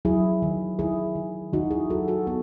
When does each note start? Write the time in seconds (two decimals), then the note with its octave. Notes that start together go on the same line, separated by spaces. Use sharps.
0.05 F#3 E4 G#4
0.42 D#3
0.79 D#3 E4 G#4
1.16 D#3
1.53 D#3 D#4 F#4
1.71 E4 G#4
1.89 F#3 F#4 A4
2.08 F#4 A4
2.27 B3 A4